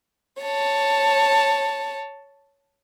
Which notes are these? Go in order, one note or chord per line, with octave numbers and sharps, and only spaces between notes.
C#5 A5